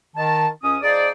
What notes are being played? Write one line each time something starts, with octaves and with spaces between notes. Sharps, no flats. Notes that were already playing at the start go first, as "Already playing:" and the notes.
D#3 A5
C#2 C#4 D#6
F3 D#4 G#4 C5 D5